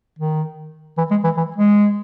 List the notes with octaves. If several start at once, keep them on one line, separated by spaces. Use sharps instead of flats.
D#3
E3
G#3
E3
E3
G#3